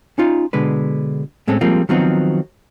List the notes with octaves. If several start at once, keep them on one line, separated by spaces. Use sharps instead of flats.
C#4 D#4 F4
B2 D3 G#3 B4
A2 G#3 C4 C#4 A4
F3 G3 G#3 A#3 C4 F4
D#3 F3 F#3 B3 C4 D#4